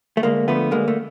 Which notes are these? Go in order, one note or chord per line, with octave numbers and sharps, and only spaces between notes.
A3
D2 G#3 A#3
D3 F3 A3 B3
D2 G#3 A#3
A3